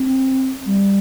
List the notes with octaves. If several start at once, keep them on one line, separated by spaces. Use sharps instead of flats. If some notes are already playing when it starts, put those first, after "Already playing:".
Already playing: C4
G3